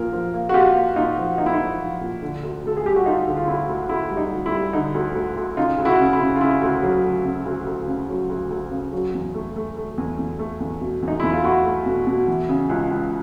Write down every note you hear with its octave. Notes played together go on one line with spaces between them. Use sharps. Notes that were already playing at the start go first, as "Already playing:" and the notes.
Already playing: A#2 F3 A#3 A#4
F3
A#3
F#4
A#2 F4 G4
A#3
A#2 D#4 F4
F3
A#3 D#4
E4
D#4
F3
F3
A#2
D3
D2
D2 A4
G#4
G3 G4
F#4
D2 D#4 F4
D3
F4
D2 E4
D2
D2 E4
G3
D#4
D2
E4
G3
D3 D#4
D2
D2
D2
C#3 D#4 F4
D2
E4 F#4
C#3
E4
C#3
F4
C#3 E4
D2
F#3
D2
C#3
D2
D2
C#3
F#3
D2
D2
C#3
F#3
E2
A3
A3
A3
E2
E2
A3
E2
B2
E2
D#4
E2 E4
F4
A3 E4 F#4
A3
B2
B2
E3
C#3
C#2
C#2